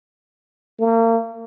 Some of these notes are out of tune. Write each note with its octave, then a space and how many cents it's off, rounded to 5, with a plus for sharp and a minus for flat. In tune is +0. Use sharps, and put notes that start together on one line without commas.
A#3 -35